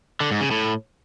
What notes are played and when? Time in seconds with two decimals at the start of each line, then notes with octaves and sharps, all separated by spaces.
0.20 D3
0.31 G#2
0.41 C#3
0.51 A2